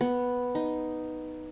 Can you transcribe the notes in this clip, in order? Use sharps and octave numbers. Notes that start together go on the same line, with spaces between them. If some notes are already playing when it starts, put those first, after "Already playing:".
B3
D#4